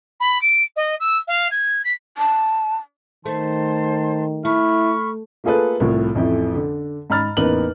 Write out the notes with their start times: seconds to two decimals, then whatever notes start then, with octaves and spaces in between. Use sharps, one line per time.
0.20 B5
0.41 D7
0.76 D#5
1.00 E6
1.27 F5
1.51 G#6
1.84 B6
2.18 A5
3.25 D#3 A3 C5 A5 C6
4.45 A3 E4 B5 C#6 F6
5.44 A3 A#3 F4 G#4 A4 B4
5.80 C2 A2 F3
6.15 A1 F2 A3 E4
6.55 D3
7.10 G#2 A#5 B5 F6 A6
7.37 A1 E2 A#3 D#4 B4 F#7